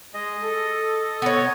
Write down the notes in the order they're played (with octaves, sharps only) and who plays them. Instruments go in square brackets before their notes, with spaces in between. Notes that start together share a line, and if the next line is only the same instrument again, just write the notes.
[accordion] G#3 G#4 [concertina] D#5
[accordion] A4
[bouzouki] B3 C#5